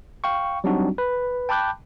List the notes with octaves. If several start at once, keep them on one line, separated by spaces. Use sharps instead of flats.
F5 G5 C#6
F#3 G3 C4 D4 D#4 F#4
B4
G5 A5 B5 D6 F#6 G6